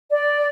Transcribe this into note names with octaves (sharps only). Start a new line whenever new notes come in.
D5